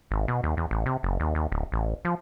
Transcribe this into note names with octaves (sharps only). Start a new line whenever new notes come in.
G#1
B2
D#2
E2
A1
C3
F#1
D#2
D#2
D1
A1
F3